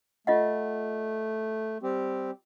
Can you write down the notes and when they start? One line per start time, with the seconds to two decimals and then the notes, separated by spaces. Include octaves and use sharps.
0.27 A3 F4 D#5 F#5
1.83 G3 C4 G4